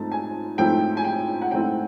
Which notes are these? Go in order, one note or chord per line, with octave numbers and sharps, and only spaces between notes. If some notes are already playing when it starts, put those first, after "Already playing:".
Already playing: G#2 F3 A3 C4 A5
G#5
G#2 F3 A3 C4 E4 G5
G#5
G5
F#5
G#2 F3 A3 C4 E4 G5